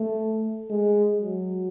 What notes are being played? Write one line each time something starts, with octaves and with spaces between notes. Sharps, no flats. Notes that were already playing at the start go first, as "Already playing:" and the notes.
Already playing: A3
G#3
F#3